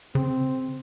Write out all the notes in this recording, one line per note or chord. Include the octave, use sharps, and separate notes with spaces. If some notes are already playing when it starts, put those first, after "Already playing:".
C#3 C4